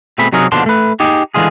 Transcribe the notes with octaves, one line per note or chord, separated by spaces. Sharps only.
B2 A3 C4 G#4 B5
C3 F#3 D#4 G#4 A#4
D#2 B2 D3 F3 D4 C6
A3 B4
D#4 G4 G#4
D3 E3 G#3 F4 G#4